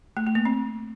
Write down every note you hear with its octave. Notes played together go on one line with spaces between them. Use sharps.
A3
A3
A#3
C4